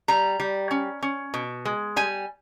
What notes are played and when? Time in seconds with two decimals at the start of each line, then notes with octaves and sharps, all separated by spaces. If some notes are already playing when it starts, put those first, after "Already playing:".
0.08 G3 A#5
0.40 G3
0.71 C#4
1.03 C#4
1.34 B2
1.65 G#3
1.96 G3 G#5